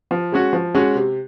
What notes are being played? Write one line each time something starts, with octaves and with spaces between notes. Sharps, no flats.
F3
G#3 C#4 F#4
F3
G#3 C#4 F#4
C3